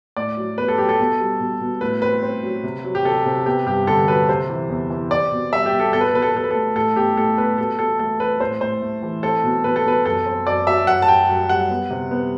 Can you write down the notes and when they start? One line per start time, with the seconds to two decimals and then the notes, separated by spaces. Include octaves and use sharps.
0.17 A2 D5
0.37 F#3
0.58 B3 B4
0.68 A4
0.78 F#3 G4
0.89 A4
0.99 B2
1.20 G3
1.40 B2
1.61 B2
1.81 A2 B4
2.02 C4 B4
2.23 C4
2.43 F#3
2.64 C3
2.84 F#3
2.95 G4
3.05 C3 A4
3.26 C3
3.46 B3 G4
3.66 G2 G4
3.87 D3 A4
4.08 F#3 B4
4.29 C3 C5
4.49 E3
4.70 E2
4.90 E3
5.11 C4 D5
5.32 B2
5.52 G3 E5
5.66 G4
5.72 B2
5.80 A4
5.93 B2 A4
6.01 B4
6.08 A4
6.14 B2 B4
6.22 A4
6.29 B4
6.34 B2 A4
6.44 B4
6.51 A3 A4
6.76 A2 A4
6.96 B3 G4
7.17 A2 A4
7.37 B3 B4
7.58 B2 A4
7.79 B2 A4
7.99 A3 A4
8.20 C4 B4
8.40 A2 C5
8.61 A2 C5
8.82 A3
9.03 E3
9.23 C4 A4
9.44 B2
9.64 B2 B4
9.76 A4
9.85 B2 B4
10.05 F#2 A4
10.26 C4
10.47 F#2 D5
10.67 F#3 E5
10.87 F#2 F#5
11.02 A5
11.08 F#2 G5
11.29 F#2
11.49 G3 F#5
11.70 B3
11.90 C3
12.11 B3